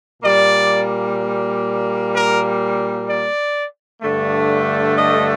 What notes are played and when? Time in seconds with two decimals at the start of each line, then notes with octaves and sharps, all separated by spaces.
0.23 A#2 G3 A#3 D5
2.12 A#4
3.08 D5
4.02 G2 D3 A3
4.97 D#5